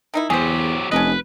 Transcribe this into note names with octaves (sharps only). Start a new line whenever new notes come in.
D#3 D#4 E4
E2 F#3 G4 G#4 C5
F1 C#4 D4 B4 D#5